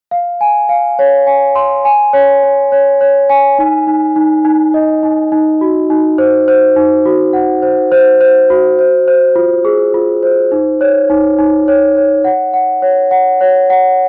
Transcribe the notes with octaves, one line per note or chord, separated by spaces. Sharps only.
F5
G#5
F5
C#5
G#5
C6
G#5
C#5
C#5
C#5
C#5
G#5
D#4
D#4
D#4
D#4
D#5
D#4
D#4
F#4
D#4
C5
C5
D#4
F#4
F#5
C5
C5
C5
F#4
C5
C5
F4
G#4
F4
C5
D#4
C#5
D#4
D#4
C#5
C#5
F#5
F#5
C#5
F#5
C#5
F#5